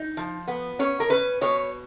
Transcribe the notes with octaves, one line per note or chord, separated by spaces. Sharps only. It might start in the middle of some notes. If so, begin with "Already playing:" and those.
Already playing: D#4
F3
B3
C#4 C#5
A#4
C#4 B4
B2 C#5